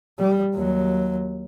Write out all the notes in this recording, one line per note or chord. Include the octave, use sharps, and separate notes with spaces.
G3
D#2 F#3